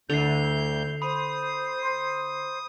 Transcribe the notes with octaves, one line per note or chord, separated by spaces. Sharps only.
D2 D3 E4 G6 C7 F7
C5 B5 D#6